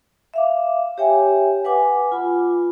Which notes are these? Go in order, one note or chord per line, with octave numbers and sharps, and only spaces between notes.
E5 F5 D6
G4 C#5 E5 G5 G#5
B4 F#5 G#5 D6
F4 B5